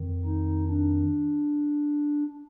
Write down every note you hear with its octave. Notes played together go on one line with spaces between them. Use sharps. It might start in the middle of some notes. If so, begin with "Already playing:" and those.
Already playing: F2 D#3
D#4
D4